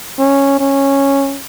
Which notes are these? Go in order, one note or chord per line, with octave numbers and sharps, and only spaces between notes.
C#4
C#4